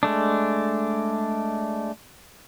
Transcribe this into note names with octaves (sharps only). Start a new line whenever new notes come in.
G#3 A3 D4